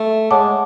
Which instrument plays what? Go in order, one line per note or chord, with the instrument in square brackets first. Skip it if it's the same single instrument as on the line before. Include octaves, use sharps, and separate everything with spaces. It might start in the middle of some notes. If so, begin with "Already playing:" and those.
Already playing: [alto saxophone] A3
[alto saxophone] G#3 [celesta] C#5 F#5 A5 D6